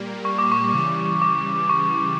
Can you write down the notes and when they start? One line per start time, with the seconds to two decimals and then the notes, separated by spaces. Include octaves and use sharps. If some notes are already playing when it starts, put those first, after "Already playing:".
Already playing: A#2 G3 A#3
0.25 C#6
0.38 D6
0.52 C#6
0.73 C#3 E3 G3
1.22 D6
1.69 C#6